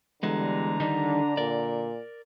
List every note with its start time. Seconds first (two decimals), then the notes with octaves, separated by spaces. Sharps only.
0.23 D3 E3 G3 G#3 B3 A#5
0.80 D#3 G3 D4 D#4
1.37 A#2 A#4 D5